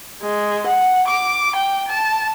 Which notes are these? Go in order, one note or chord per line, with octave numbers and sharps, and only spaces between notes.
G#3
F#5
D6
G5
A5